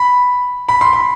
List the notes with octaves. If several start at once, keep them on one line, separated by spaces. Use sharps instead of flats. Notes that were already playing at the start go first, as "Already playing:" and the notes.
Already playing: B5
B5
C6
B5